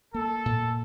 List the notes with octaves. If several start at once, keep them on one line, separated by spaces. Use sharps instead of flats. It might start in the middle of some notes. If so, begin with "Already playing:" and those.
A#3 A4
A#2